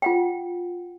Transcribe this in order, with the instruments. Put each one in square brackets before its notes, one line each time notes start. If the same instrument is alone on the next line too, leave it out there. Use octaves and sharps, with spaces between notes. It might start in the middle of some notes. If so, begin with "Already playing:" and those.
[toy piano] F4 F#5 G5